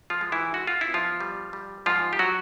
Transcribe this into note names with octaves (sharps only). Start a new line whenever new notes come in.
F3 F4
G#3
E3 E4
G#3 F#4
F4
E4
B3
F3 F4
G3
G3
G#2 F3 F4
G4
F#3 F#4